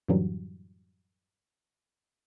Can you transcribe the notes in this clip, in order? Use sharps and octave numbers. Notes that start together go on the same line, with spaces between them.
F#2 A2 D3 E3 F#3 G3